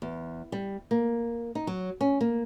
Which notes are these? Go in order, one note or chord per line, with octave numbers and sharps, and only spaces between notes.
E2
G3
A#3
D#4
F#3
C#4
A#3